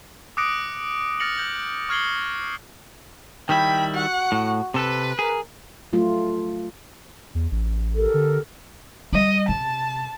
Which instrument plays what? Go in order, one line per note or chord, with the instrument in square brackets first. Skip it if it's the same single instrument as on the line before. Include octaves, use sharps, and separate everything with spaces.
[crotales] D6 D#6 F#6 A#6 C#7 D7
F6 A6 A#6 C#7 F7 F#7
F#6 G6 F#7
C#6 F6 G#6 C7 F#7 G7
[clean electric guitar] D#3 G3 E4 [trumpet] G5 [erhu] B5
[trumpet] F#4 [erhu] F#5
[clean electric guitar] A2
[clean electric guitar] C3 A4 [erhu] B4
[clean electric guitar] G#4 [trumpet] A#4
[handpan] F#3 A3 F4
[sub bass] E2
A1
[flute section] G4 A4 A#4
[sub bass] D3
[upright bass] G3 [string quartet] D#5
[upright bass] C3 [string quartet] A5